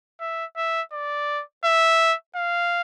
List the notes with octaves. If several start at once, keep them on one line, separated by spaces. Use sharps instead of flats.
E5
E5
D5
E5
F5